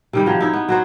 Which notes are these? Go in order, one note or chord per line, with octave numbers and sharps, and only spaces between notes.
C3 D#3 G3
F3 F#3
D#4 E4
B3
F#3 F#4 C5